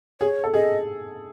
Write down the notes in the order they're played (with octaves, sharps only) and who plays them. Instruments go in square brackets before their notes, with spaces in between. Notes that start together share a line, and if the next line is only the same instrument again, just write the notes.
[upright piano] G#4 [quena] C#5
[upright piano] A4
[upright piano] G#4 [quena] D#5